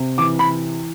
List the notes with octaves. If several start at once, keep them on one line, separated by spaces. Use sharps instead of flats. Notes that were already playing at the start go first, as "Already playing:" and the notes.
Already playing: C3
E3 D6
B5